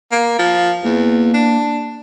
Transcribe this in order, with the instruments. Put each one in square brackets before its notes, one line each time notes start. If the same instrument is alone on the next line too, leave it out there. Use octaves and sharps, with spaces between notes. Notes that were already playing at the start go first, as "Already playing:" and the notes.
[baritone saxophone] A#3
F3
[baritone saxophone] E2 [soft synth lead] A#3
[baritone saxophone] D4